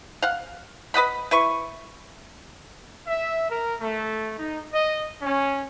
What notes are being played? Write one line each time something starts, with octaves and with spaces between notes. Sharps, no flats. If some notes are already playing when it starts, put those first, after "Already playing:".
F5 F#5
B4 D#5 F#5 B5
E4 B4 C#6
E5
A#4
A3
D#4
D#5
C#4